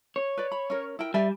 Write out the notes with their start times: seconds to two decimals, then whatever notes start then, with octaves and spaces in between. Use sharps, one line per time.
0.16 C#5
0.37 B4 D5
0.52 B5
0.70 C#4 A#4
0.99 E4 A#4 G5
1.14 G3 D5 E5 G#5